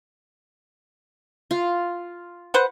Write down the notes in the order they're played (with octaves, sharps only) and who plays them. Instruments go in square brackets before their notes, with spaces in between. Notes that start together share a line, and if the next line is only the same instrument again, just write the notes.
[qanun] F4
[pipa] B4 C5 F#5